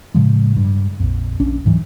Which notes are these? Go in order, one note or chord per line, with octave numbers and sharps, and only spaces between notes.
A2 C#3 F3 G#3
G2
A#1 F2
A#1 C#4 D4
D2 G#2 E3 F#3